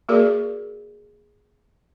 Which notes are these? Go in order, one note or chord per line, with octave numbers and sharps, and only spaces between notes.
A#3 F#4 G#4 A#4 D5